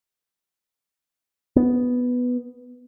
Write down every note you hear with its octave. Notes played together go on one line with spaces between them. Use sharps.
B3